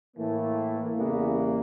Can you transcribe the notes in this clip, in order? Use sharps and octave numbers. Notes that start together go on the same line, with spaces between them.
A2 E3 A3 A#3
E2 C#3 E3 G3 A#3 B3